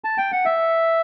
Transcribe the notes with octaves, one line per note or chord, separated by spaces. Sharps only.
A5
G5
F#5
E5